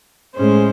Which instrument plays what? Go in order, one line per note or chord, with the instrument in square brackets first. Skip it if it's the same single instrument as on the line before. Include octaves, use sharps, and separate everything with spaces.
[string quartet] A2 G#3 C#4 C5